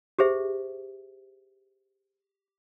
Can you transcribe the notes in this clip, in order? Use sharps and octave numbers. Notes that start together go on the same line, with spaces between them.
G4 G#4 C5 E5